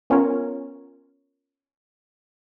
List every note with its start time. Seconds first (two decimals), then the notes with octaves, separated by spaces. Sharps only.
0.10 B3 C#4 F4 A#4 C#5